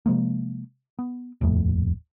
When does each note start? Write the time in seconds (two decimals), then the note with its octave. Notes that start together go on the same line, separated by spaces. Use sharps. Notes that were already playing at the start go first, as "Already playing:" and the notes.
0.06 C3 F3 G#3 A#3
0.99 B3
1.41 D#1 A1 F2 A3